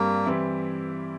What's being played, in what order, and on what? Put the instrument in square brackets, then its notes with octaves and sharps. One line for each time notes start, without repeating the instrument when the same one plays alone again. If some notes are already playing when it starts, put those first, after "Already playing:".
Already playing: [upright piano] G2 G3 C4 [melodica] A#3
[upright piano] E3 G3 C4 E4